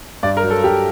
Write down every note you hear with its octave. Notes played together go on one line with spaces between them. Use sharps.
G2 D5
A#4
F#3
A4
G2 G4